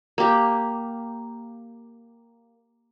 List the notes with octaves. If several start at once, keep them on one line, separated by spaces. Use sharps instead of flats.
A#3 G4